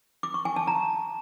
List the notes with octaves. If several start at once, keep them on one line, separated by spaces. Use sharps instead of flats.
D6
C#6
G#5
A5
A#5